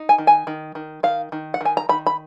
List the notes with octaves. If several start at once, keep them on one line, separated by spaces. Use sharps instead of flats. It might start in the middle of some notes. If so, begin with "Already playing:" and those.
Already playing: D#4
G#5
D#3
G#5
D#3
D#3
D#3 F5
D#3
F#5
D#3 G#5
A#5
D#3 B5
B5